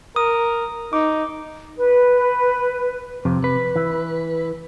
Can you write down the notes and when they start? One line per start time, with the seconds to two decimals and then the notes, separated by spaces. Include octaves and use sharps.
0.16 A#4 D#6
0.93 D#4 D6
1.77 B4
3.25 F2 C3
3.44 B4
3.76 E3